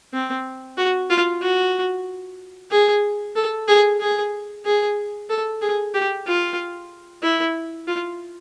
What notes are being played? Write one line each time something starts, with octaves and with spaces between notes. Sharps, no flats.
C4
F#4
F4
F#4
G#4
A4
G#4
G#4
G#4
A4
G#4
G4
F4
E4
F4